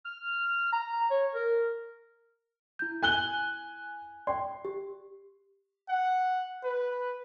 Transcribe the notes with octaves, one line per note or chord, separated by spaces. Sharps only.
F6
A#5
C#5
A#4
E4 G6
G#5 F#6 G7
D5 G5 C6
G4
F#5
B4